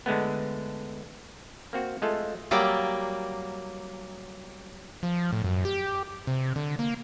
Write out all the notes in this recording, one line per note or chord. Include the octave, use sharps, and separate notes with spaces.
D3 G#3 A3 B3
A#3 C4 F#4
G#3 A3 F4 A4
F#3 G3 A#3 D5
F3
A2
F#2
G4
C3
D3
A#3